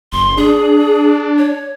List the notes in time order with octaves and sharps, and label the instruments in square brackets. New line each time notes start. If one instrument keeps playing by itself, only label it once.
[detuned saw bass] F#1 [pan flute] C6
[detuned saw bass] D4 [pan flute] G#4
[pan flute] C#5